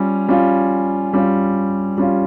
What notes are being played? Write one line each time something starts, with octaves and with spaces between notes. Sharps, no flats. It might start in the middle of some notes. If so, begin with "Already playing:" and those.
Already playing: G3 C#4 F4
G3 C#4 F4
G3 C#4 F4
G3 C#4 F4